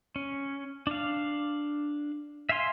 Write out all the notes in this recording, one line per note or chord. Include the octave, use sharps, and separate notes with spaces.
C#4
D4 F5
E5 F5 G#5 C6